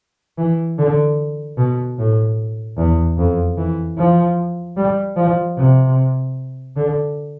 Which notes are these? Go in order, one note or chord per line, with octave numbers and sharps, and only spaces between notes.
E3
D3
B2
A2
E2
F2
E3
F3
G3
F3
C3
D3